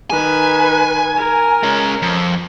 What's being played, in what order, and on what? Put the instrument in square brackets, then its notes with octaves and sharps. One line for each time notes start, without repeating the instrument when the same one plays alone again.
[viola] D#3 B4 [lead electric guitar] G#5
[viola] A#4
[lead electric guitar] G#3 C#4
F2